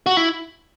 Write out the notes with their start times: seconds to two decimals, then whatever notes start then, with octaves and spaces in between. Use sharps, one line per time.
0.06 F#4
0.17 E4